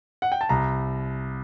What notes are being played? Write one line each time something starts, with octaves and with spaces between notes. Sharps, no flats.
F#5
G5
A5
C2 A#5